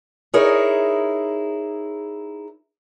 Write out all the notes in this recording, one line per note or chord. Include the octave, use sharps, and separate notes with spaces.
D#4 E4 G#4 A#4 C#5